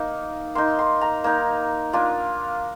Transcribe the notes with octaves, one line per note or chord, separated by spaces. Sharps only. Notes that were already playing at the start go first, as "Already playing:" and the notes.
Already playing: A#3 D#4
A#3 D#4 C6
C6
A#5
A#3 D#4
A#3 D4 F4